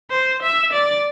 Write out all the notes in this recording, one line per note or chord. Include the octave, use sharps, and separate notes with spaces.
C5
E5
D5